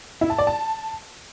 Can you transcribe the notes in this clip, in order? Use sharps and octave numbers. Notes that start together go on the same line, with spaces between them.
E4
A5
D5
A5